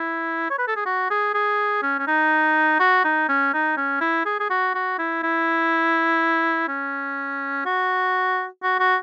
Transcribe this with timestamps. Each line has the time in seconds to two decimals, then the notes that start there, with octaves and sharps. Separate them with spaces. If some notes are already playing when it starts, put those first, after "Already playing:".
Already playing: E4
0.50 C#5
0.58 B4
0.68 A4
0.76 G#4
0.85 F#4
1.10 G#4
1.34 G#4
1.83 C#4
1.99 C#4
2.07 D#4
2.79 F#4
3.05 D#4
3.29 C#4
3.53 D#4
3.77 C#4
4.01 E4
4.26 G#4
4.40 G#4
4.50 F#4
4.75 F#4
4.99 E4
5.23 E4
6.68 C#4
7.66 F#4
8.63 F#4
8.79 F#4